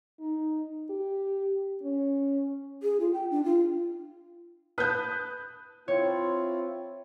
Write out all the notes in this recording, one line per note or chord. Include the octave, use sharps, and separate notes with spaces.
D#4
G4
C#4
G#4
F4
G5
D4
F4
B4 A5 D#6 F#6 G6
C4 E4 F4 C#5